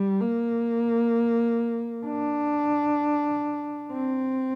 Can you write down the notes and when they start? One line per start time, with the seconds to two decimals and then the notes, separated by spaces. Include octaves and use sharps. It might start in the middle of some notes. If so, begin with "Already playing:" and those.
Already playing: G3
0.21 A#3
2.07 D4
3.93 C4